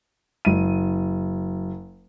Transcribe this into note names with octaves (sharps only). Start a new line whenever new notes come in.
F#1 D#7